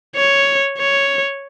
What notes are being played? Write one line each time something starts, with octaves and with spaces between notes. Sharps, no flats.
C#5
C#5